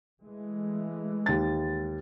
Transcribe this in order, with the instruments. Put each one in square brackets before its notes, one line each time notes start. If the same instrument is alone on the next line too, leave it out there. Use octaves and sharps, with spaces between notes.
[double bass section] E3 G#3 A3
[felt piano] D#2 A6